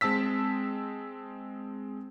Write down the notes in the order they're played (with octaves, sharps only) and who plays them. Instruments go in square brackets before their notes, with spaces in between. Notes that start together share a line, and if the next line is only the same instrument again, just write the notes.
[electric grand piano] G#3 C4 A5 E6 B6